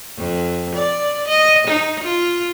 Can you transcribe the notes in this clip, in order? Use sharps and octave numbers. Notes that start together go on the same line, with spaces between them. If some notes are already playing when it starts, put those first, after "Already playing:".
F2
D5
D#5
D#4
F4